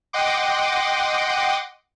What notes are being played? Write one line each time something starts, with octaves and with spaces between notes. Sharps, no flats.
D#5 F#5 G5 C6 D6